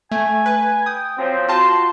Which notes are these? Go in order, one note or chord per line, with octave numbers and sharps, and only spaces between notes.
A3 G#5
B4
G5 D#6
F3 F#3 C4
F4 F#4 A5 C6